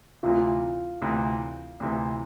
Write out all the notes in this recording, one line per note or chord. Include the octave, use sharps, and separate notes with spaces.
D2 C3 E3 F4
D2 C3 E3
D2 C3 E3